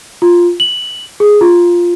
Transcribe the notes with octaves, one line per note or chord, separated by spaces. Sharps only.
F4
F#7
G#4
F4